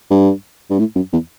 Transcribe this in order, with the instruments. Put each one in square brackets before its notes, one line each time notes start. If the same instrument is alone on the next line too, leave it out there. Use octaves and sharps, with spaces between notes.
[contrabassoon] G2
G2
A2
F#2
E2